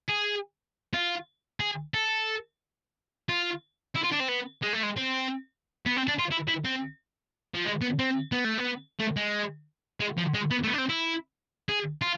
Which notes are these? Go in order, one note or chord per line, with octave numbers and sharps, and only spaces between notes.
G#4
F4
G#4
A4
F4
E4
F4
D4
C4
B3
G#3
A3
G#3
C4
B3
C4
D4
F4
E4
E4
C4
F3
G#3
B3
C4
B3
A3
B3
A3
G#3
G#3
F3
G#3
B3
A3
B3
D4
C4
E4
G#4
F4